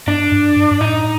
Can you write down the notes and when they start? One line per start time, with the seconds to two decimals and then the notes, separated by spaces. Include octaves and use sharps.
0.07 G2 D4
0.32 G2
0.56 G2
0.71 G2
0.80 A2 D#4